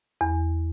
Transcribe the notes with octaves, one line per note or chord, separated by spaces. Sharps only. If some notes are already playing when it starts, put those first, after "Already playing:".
E2